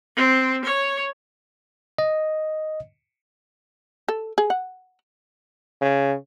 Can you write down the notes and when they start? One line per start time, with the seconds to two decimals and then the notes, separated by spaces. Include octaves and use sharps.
0.17 C4
0.65 C#5
1.98 D#5
4.08 A4
4.38 G#4
4.50 F#5
5.81 C#3